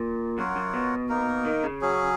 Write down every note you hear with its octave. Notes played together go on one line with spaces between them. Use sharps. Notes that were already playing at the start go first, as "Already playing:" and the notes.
Already playing: A#2
F#2 F4 A#4 C#5 F#5
F#2
B2
A#3 D#4 A#4
D#3
C#3
F#3 C#4 G#4